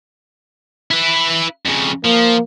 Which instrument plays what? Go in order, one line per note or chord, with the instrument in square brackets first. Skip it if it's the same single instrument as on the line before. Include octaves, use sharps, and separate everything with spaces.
[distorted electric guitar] E4 B4
F2 C#3
[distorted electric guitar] F3 [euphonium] A#3